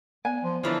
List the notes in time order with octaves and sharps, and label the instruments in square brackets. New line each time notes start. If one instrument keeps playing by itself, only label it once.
[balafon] B3 D5 [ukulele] G#5
[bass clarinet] F3
[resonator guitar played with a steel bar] D3 E3 F3 [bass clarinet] E4 [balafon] C5 C#5 A#5